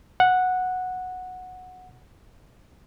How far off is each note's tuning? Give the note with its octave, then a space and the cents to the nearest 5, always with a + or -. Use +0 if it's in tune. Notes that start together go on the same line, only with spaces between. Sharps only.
F#5 -10